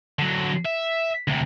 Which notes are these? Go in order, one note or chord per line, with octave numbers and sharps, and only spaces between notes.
D3 F#3
E5
D2 C3